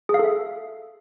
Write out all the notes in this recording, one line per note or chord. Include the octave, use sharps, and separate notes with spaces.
G#4
F5
A4
E5